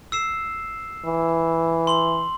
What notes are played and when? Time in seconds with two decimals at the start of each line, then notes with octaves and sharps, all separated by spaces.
0.12 E6 C7 E7
1.05 E3
1.87 C6 F#7